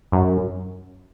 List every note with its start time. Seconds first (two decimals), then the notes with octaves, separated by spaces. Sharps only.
0.12 F#2